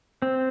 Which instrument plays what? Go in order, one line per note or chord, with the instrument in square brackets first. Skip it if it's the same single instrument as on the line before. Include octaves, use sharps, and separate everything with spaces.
[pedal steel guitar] C4